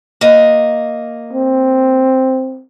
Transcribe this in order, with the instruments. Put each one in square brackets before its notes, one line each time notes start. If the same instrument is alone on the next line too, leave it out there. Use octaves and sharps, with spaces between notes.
[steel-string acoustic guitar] A#3 D#5
[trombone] C4